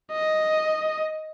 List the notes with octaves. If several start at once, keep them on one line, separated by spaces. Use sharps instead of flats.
D#5